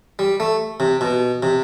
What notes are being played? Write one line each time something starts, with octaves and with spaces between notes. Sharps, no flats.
G3
A3
C3
B2
C3